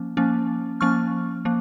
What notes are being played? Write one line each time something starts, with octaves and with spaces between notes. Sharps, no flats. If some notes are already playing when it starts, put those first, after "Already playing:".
Already playing: F3 A#3 C#4
F3 A#3 C#4
F3 A#3 C#4 C#6 F6
F3 A#3